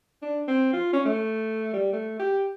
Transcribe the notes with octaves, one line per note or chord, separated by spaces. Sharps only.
D4
C4
F4
C#4
A3
G3
A3
G4